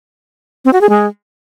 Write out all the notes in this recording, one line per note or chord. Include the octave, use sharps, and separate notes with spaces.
C4
F#4
G#4
G#3